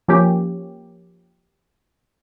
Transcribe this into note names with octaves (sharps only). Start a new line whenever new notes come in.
F3 A#3 C#4 G4